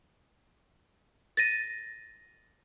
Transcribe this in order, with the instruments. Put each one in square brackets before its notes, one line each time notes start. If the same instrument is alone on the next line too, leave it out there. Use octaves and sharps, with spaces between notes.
[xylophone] A6 A#6 D#7